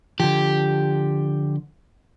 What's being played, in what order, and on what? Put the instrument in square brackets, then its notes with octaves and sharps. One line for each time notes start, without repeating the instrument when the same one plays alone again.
[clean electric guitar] D3 F3 [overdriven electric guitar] G4